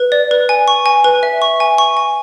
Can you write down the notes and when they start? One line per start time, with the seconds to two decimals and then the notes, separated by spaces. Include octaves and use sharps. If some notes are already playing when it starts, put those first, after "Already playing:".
Already playing: B4
0.12 D5
0.31 B4
0.49 G#5
0.68 C#6
0.86 G#5
1.04 B4
1.23 E5
1.42 C#6
1.60 G#5
1.78 C#6
1.97 G#5